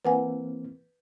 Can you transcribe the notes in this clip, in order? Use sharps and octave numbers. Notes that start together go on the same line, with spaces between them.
E3 A#3 C4 B4 F#5 G#5